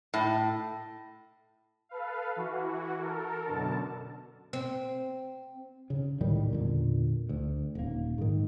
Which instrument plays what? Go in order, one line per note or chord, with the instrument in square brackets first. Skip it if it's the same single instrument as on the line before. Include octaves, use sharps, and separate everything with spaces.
[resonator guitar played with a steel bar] A2
[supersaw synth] A4 B4 F5
E3 F#4
A4 A#4
F#2 B2 D3 A5
[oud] C4
[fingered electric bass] C#3
C#2 A2 D#3 G3
E2 A#2 D3
D2
D#1 A#3
G#2 D#3